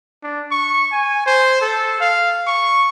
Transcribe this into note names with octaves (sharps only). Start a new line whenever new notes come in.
D4
C#6
G#5
C5
A4
F5
C#6